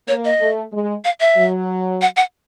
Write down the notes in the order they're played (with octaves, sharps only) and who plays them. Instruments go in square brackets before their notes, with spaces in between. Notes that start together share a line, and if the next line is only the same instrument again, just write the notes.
[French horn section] A#3 [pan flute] C#5
[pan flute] D#5
[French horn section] A3
G#3
[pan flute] F5
E5
[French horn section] F#3
[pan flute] F#5
F#5